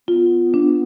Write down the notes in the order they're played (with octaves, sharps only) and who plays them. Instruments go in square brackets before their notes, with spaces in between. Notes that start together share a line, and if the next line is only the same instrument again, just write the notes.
[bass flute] B3 [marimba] F4
[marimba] D4